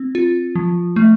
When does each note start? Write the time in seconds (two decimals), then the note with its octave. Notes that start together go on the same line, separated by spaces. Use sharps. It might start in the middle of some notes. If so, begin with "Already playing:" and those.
Already playing: C4
0.15 F4
0.55 F3
0.96 A3